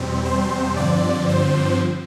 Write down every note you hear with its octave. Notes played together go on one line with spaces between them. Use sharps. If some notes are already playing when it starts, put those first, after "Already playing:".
Already playing: E2 B2 G3 C4
C5
G2 D3 F3 C4 D5
C5